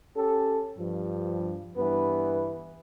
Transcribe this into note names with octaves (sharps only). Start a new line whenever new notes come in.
C#4 G4 A4
G2 F3
G2 E3 B3 B4